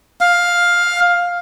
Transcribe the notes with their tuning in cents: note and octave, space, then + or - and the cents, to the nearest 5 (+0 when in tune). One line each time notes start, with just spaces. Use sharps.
F5 +10